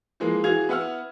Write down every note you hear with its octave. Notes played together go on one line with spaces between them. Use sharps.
E3 F3 G#3 A#3
E3 F#4 G#4 F5 G#6 F7
B3 E4 F#5 E6 F6